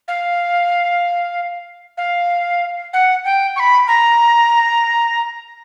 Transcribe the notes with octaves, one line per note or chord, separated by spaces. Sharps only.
F5
F5
F#5
G5
C#6
B5
A#5